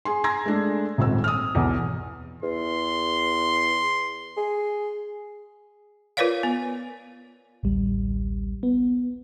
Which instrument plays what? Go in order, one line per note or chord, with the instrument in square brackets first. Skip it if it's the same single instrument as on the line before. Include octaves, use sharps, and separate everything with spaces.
[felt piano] G#4 G#5 C6
G#5 A#5 C6 E6 G#6 A#6
G#3 A3 D4
D#1 G#1 C4 E6
D#6 F6
B1 E2
[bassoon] E2 [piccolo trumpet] C6
[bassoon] G#4
[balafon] F4 A#4 B4 C#5 D5 F5
B3
[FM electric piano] A1 D2 G3
B3